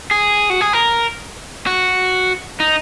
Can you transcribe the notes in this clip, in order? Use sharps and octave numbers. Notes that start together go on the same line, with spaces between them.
G#4
F#4
G#4
A#4
F#4
D#4